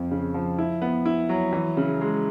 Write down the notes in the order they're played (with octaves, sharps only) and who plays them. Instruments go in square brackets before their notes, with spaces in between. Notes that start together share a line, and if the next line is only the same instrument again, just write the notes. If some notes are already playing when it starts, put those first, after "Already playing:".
Already playing: [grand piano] F2 F3
C#3
F3
E4
B3
E4
F#3
E3
C#3
G#3